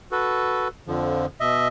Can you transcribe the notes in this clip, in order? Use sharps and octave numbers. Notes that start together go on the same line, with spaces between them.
F#4 A4 B4
F2 D3 F3
B2 D#5 E5